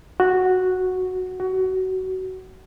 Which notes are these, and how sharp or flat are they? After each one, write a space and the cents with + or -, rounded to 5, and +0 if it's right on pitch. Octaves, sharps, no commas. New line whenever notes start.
F#4 -5
F#4 +20